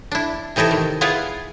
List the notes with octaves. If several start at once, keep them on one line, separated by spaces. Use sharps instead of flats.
D4 E4
C3 E3 D#4 E4 A4
D#3
B3 E4 F4 G#4 F5